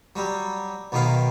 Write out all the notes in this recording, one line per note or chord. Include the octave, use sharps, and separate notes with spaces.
F#3 G3
B1 B2 D#3 B3 F5